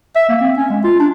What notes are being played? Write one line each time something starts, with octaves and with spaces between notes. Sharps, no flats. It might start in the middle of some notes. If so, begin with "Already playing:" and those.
E5
A#3
C4
C#4
G#3
F4
D4